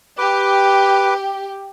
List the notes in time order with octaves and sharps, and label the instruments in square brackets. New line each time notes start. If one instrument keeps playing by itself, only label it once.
[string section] G4 [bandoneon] B4 D6